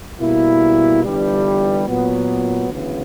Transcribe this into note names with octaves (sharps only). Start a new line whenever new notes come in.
B2 G3 A#3 E4
G1 G2 E3 G3
A#2 F#3 B3
D2 C#3 E3 B3